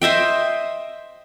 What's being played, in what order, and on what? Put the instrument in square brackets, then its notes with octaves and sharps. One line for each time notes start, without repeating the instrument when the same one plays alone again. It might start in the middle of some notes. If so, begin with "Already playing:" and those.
[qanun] C5 D#5 E5 G5